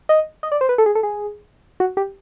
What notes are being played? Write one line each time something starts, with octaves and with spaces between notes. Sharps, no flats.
D#5
D#5
D5
C5
B4
A4
G#4
A4
G#4
F#4
G4